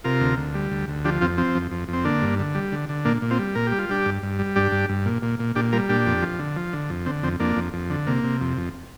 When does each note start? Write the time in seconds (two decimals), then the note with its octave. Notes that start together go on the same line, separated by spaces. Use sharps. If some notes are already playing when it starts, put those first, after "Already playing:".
0.04 C3 F4 A#4
0.21 D2
0.37 D2
0.54 G3
0.71 D2
0.88 D2
1.05 F3 D4 G4
1.21 F2 C4 F4
1.38 F3 C4
1.55 F2
1.71 F2
1.88 F2 C4
2.04 D3 A#3 D4
2.22 G2
2.39 D3
2.55 G3
2.72 D3
2.89 D3
3.05 A#2 A#3 D4
3.22 A#2
3.30 C4 F4
3.39 G3
3.55 A#2 A#4
3.67 G3 G4
3.79 F4
3.89 G3 D4 G4
4.06 G2
4.22 G2
4.39 G3
4.56 G2 D4 G4
4.72 G2
4.89 G2
5.06 A#2
5.22 A#2
5.39 A#2
5.56 A#2 D4 G4
5.72 G3 F4 A#4
5.89 A#2 D4 G4
6.06 F2
6.22 F3
6.39 D3
6.56 F3
6.73 D3
6.90 F2
7.06 D3 C4
7.23 F2 C4
7.40 F2 A#3 D4
7.56 F2
7.73 F2
7.90 D3
8.07 C3 A#3
8.24 C3
8.41 F2
8.57 F2